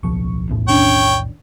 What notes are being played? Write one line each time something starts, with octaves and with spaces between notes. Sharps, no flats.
D1 B1 F3 C#6
B1 E2 A2
D#3 C#4 D4 C#5 G5